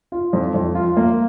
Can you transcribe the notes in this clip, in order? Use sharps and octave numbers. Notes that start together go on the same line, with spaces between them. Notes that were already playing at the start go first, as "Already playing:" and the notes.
F4
F2
F2
F4
A#3